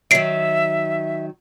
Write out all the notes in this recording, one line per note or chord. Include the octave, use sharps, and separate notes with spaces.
D#3 F#3 E5 C7 D7